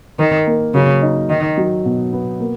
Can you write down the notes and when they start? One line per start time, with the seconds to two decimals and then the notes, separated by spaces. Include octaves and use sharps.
0.19 D#3 A#4
0.47 A#3
0.74 C#3 F#3
1.02 D#4
1.30 D#3 D#4
1.57 F#3
1.85 B2
2.13 B3
2.40 A#3